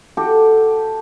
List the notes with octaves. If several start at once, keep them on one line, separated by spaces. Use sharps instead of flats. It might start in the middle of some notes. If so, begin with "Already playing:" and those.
F#4 G4 A4